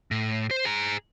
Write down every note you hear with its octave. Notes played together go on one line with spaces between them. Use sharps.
A2
C5
G#4 A#5